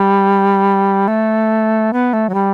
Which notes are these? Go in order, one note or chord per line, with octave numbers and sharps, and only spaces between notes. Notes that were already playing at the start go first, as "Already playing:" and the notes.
Already playing: G3
A3
B3
A3
F#3
G3